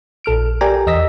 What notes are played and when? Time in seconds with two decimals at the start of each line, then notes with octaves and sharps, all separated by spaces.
0.24 A#1 A4 F6 D7
0.61 G4 A#4 D5 G5 G#5 A#5
0.87 E2 D#5 E6 A#6 B6